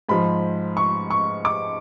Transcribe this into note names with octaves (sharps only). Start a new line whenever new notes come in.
G#2 F3 B5
C#6
C#6
D6